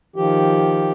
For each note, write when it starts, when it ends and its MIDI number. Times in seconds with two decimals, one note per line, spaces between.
0.16 0.92 51
0.16 0.92 53
0.16 0.92 67